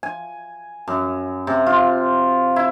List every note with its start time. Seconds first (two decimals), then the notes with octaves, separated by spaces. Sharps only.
0.03 G#5
0.88 F#2
1.47 C3
1.66 F4
2.56 E4